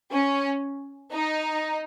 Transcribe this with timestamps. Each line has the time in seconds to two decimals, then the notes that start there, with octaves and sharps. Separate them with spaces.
0.12 C#4
1.13 D#4